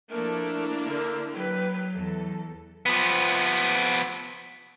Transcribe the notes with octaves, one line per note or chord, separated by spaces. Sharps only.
F3 A3 A#3 D4 E4 A#4
D3 A#4
F#3 G4 B4
E2 A4
F3 B3